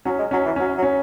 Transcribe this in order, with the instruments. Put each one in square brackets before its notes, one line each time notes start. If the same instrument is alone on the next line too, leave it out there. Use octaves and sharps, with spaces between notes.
[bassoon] F#3 [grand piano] C#4
[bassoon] G#3
[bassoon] F#3 [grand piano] C#4
[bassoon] E3
[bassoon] F#3 [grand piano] C#4
[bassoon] F#3
[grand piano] C#4